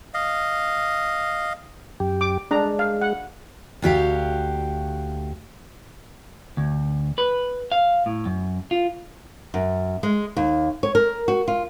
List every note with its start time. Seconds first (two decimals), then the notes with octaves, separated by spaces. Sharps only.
0.14 D#5 F5
2.00 F#2 G4
2.21 D6
2.51 G#3 D4 A#5
2.79 F5
3.02 F#5
3.82 D2 F#4 G4 F5
6.57 D2
7.18 B4
7.72 F5
8.06 A2
8.25 F#2
8.71 F4
9.54 F#2
10.03 G#3
10.37 D#2
10.83 C#5
10.95 A#4
11.28 F#4
11.48 F4